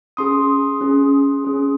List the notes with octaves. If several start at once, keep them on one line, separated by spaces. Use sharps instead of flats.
C#4 G#4 C6 D#6
C#4 G#4
C#4 G#4